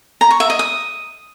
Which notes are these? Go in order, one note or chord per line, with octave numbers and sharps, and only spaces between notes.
A#5
C#6
E5
D#5
D#6